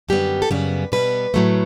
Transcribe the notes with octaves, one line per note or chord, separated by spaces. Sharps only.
F#2 D3 G3 B3 G4
A4
F#2 C#3 G3 B3 B4
B2 G3 B3 B4
A2 F#3 A3